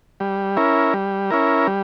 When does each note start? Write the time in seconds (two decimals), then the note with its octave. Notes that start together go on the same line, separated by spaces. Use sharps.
0.20 G3
0.57 C#4 E4 A#4
0.94 G3
1.30 C#4 E4 A#4
1.67 G3